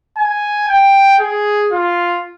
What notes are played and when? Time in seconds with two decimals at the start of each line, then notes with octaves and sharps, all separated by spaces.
0.17 G#5
0.69 G5
1.21 G#4
1.72 F4